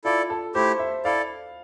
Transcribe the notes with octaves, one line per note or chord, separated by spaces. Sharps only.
E4 F4 A4 D5
A4
A3 E4 G4 C5
E5
E4 A4 D5 F5